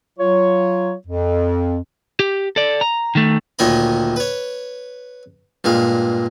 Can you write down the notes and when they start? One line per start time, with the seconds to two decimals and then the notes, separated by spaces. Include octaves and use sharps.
0.19 F#3 F4 C#5
1.07 F2
2.20 G4
2.56 A4 D5
2.81 A#5
3.15 D#3 A3
3.59 D2 A#2 D#3 C#5 D#5 B5
4.16 B4 C#5
5.64 G2 A#2 G#3 F5